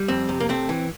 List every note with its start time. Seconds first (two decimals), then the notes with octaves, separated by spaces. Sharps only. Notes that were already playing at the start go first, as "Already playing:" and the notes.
Already playing: G3
0.08 F2 C4
0.29 C3
0.40 A#3
0.49 A3 C4
0.69 E3